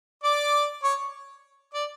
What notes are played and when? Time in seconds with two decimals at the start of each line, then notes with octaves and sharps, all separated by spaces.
0.23 D5 D6
0.83 C#5 C#6
1.74 D5 D6